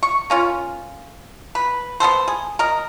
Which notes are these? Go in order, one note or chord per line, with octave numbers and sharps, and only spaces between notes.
C#6
A#3 C#4 F4
B4
B3 C4 A4 C5
G#4
A#4 D#5